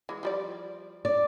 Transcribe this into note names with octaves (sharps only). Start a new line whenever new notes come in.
E3 G#3
F3 G3 D5
D5